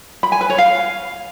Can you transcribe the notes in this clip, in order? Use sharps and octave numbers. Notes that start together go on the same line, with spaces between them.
B5
G#5
B4
C#5
F5